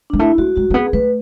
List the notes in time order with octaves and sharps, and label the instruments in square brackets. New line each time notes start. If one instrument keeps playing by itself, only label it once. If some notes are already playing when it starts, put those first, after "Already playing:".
[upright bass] G#3 [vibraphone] D4
[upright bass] A3 [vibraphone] E4
[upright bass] A3 [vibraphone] F#4
[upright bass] G#3 [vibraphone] F#4
[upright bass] A3
[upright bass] B3 [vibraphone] G#4
[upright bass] A3 [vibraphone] B4